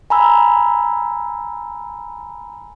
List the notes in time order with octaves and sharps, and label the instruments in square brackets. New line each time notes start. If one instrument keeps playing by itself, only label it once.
[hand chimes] G#5 A#5 B5 E6